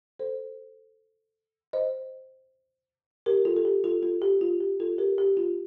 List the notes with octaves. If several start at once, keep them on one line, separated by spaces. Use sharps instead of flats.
A4 C5
C5 D#5
G4 A#4
F4 A4
A4
G4
F4 A4
F4 A4
G4
F4
G4
F4 A4
G4 A#4
G4
F4